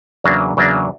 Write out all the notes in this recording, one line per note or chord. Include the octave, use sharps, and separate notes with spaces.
E2 C#3 F#3 A#3 D4
E2 C#3 F#3 A#3 D4